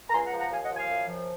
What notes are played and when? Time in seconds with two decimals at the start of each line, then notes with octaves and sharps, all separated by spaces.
0.10 A#5
0.14 C#2 G#5 C6
0.26 F#5 A#5
0.33 F3
0.39 F#5 A#5
0.51 D#2 F5 G#5
0.64 D#5 F#5
0.71 F3
0.76 F5 G#5
0.90 F#2
1.08 F3